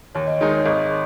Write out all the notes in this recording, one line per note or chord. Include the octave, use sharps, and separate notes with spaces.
D#2 C#5
D#5
D#3 G#3 D#4 C#5
C#5
G#1 D#5